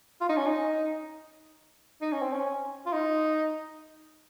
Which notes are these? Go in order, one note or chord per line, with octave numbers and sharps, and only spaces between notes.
F4
D#4
C#4
D#4
D#4
C#4
C4
C#4
F4
D#4